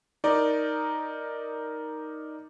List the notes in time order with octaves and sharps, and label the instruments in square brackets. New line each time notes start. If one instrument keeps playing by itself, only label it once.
[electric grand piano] D#4 A#4 D5